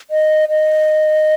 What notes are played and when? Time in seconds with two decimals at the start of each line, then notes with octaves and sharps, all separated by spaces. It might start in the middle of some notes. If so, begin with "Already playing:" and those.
0.11 D#5
0.49 D#5